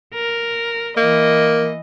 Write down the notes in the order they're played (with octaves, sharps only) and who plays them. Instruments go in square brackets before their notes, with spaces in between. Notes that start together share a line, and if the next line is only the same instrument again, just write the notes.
[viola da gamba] A#4
[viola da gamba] E3 D#5 [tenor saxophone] A#3